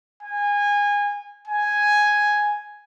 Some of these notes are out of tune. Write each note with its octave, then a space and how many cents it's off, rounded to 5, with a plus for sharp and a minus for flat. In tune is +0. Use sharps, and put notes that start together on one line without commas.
G#5 -25
G#5 +0